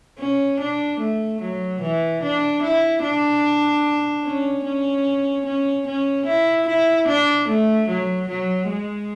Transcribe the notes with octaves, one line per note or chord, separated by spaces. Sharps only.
C#4
D4
A3
F#3
E3
D4
E4
D4
C#4
C#4
C#4
C#4
E4
E4
D4
A3
F#3
F#3
G#3